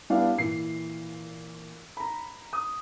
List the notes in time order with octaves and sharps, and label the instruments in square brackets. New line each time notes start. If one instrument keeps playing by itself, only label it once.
[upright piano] G3 B3 D4 E4 F5
A#2 E3 C7
A#5 B5
D#6